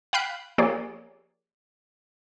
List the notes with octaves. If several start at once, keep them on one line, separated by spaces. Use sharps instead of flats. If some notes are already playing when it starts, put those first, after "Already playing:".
F5 G5 B5 F#6 D7
F3 A#3 G4 G#4 C#5 D5